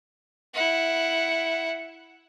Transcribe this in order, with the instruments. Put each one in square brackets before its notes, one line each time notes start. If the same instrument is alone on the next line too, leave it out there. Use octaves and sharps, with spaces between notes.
[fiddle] E4 F#5